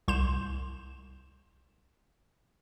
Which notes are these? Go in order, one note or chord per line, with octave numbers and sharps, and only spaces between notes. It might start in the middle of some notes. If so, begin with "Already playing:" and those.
C2 C6 G6 E7